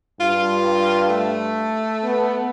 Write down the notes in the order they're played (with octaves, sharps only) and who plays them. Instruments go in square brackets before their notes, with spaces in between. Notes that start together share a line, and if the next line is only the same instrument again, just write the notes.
[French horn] G2 [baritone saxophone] F4
[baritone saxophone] A3
[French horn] B3